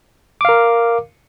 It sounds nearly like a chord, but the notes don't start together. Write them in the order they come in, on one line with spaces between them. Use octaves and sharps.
D6 F5 A#4